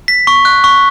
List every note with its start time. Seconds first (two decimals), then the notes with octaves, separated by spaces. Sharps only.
0.08 B6
0.27 C#6
0.45 F#6
0.64 C#6